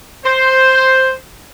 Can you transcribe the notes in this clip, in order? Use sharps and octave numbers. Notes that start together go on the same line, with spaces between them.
C5